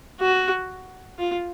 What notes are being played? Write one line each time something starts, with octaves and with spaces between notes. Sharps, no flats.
F#4
F4